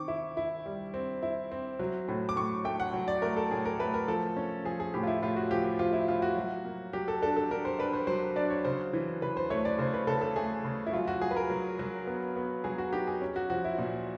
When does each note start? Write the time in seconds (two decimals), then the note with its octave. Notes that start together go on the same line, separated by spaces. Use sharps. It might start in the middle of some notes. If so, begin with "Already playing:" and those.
Already playing: D#3 C4 C#6 D6
0.08 E4
0.37 E4
0.66 G3
0.94 C4
1.23 E4
1.52 C4
1.80 F#3
2.08 A2
2.29 D6
2.36 A2 C#6
2.65 A3 G5
2.80 F#5
2.94 F#3
3.08 D5
3.22 A3 A#4
3.36 A4
3.51 A2 G#4
3.65 A#4
3.79 A3 B4
3.94 A#4
4.08 F3 A4
4.37 C#4
4.64 F3 G#4
4.80 G#4
4.94 A2 G4
5.03 F4
5.07 E4
5.22 A2 F4
5.36 F#4
5.51 F3 G4
5.64 G4
5.79 F3 F4
5.93 E4
6.08 F3 F4
6.22 F#4
6.37 F#3
6.65 A#3
6.93 F#3 G4
7.08 A4
7.22 D4 A4
7.36 A4
7.51 D4 A#4
7.65 C5
7.79 D4 B4
7.93 C5
8.07 F#3 C5
8.36 D4 D5
8.50 C#5
8.65 C#3 C5
8.93 E3
9.22 C#3 B4
9.37 C5
9.50 A3 C#5
9.65 D5
9.79 C#3 C5
9.94 B4
10.07 C#3 A4
10.21 A4
10.36 A3 G#4
10.64 C#3
10.86 E4
10.93 F#3 F4
11.08 F#4
11.22 F#3 G#4
11.31 B4
11.36 A#4
11.50 F#3
11.79 F#3
12.07 B3
12.36 B3
12.64 F#3 G#4
12.78 F#4
12.92 D#4 G4
13.07 G#4
13.22 C#4
13.36 F#4
13.50 F3 F#4
13.65 E4
13.78 A#2